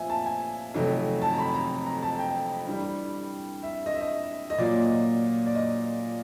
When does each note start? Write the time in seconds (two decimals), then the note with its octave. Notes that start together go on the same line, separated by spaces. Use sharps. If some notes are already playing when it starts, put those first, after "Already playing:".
Already playing: A#2 F3 A3 C4 E5 G#5
0.10 A5
0.26 G#5
0.74 F2 C3 D#3 F#3 A3
1.22 A5
1.33 A#5
1.38 B5
1.54 A#5
1.86 A#5
2.02 A5
2.18 G5
2.66 G2 E3 G3
3.63 E5
3.86 D#5
3.94 E5
4.01 D#5
4.50 D#5
4.58 A#2 F#3 A#3 D5
4.83 D#5
5.46 D5
5.55 D#5